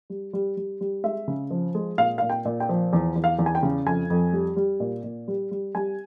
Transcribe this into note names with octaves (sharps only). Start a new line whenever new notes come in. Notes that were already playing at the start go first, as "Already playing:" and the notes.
G3
G3
G3
G3
G#3 E5
C#3
F3
G#3
A#2 F5
A#2 F5
G5
A#2
G5
F3
E2
E2
F5
E2
G#5
G5
C#3
F2 G#5
F2
G3
G3
A#2
A#2
G3
G3
G3 G#5